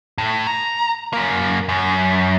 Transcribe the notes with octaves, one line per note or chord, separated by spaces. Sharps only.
A2
A#5
F#2 A#3
F#2